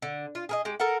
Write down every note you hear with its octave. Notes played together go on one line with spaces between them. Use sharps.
D3
F4
G#4 A#4 D#5
G#3 G4
A4 A#4 F5 F#5